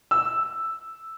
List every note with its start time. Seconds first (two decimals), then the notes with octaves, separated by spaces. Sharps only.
0.11 E6